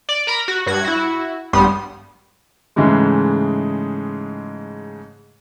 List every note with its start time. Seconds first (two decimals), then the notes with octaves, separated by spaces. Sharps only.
0.09 D5
0.27 A#4 A#5 B5
0.48 F#4
0.66 G2 F#4 G#6
0.85 E4 F#4
1.53 A1 G2 G3 B3 C6 D#6
2.76 G#2 C#3 E3 G#3 A3